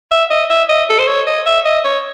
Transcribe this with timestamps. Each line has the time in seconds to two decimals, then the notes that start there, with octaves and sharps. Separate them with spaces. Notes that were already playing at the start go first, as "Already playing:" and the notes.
0.11 E5
0.30 D#5
0.50 E5
0.69 D#5
0.90 A4
0.99 C5
1.07 C#5
1.27 D#5
1.46 E5
1.65 D#5
1.85 C#5